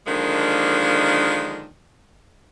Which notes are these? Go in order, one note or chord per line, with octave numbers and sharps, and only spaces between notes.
D3 D#3 F3 G#3 A#3 D4